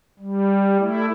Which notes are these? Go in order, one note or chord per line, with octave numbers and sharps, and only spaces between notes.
G3
A3 E4